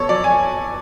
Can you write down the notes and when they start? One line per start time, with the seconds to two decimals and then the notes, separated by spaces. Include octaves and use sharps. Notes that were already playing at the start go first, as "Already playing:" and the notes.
Already playing: B2 A4 C#5
0.09 F#3 D5
0.24 G#5